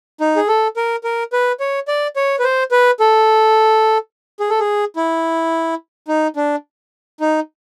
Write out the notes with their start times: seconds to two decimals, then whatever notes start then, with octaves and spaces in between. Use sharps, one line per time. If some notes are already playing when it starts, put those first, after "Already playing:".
0.21 D#4
0.36 G#4
0.48 A4
0.76 A#4
1.04 A#4
1.33 B4
1.60 C#5
1.88 D5
2.16 C#5
2.39 B4
2.44 C5
2.71 B4
3.00 A4
4.40 G#4
4.50 A4
4.59 G#4
4.96 E4
6.08 D#4
6.36 D4
7.20 D#4